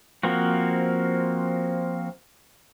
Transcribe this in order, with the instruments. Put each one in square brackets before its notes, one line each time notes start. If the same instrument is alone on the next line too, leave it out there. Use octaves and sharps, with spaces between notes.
[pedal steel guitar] F3 A#3 C4 F#4